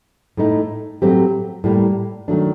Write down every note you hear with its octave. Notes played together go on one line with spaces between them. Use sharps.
A2 A3 D#4
A2 F#3 A3 C4 G4
A2 G3 A#3
D#3 F#3 A3 D4